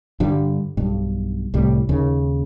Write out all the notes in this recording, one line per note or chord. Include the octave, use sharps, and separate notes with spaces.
G2 D3 G3
B1 G2
C2 A2 G3
D#2 C#3